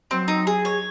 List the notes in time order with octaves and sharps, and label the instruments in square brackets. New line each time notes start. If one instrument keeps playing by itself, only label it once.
[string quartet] F#3 [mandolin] C4
[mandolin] D#4
G#4
C#5